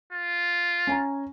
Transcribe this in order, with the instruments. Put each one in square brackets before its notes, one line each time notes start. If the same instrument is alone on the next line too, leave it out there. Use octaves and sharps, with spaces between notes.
[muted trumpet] F4
[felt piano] C#4 G#5 A#5